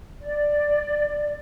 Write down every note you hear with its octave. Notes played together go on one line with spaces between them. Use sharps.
D5